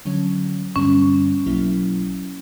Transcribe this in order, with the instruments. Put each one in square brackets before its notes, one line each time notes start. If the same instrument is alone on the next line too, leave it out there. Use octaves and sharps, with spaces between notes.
[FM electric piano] D3 F#3 C#4
[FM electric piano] G2 D3 G3 B3 [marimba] C#4
[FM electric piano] B1 B2 F#3 A#3 E4